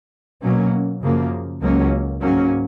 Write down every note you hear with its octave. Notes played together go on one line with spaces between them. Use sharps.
B2 F#3 A#3 C#4
F#2 C#3 F3 A#3
C#2 C#3 F#3 A#3 C#4
G#2 F#3 A#3 C#4